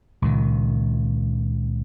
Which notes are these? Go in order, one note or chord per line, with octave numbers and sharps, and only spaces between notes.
C#2 A#2 D#3